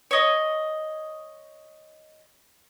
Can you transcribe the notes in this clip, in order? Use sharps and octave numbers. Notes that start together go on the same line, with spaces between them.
C#5 D#5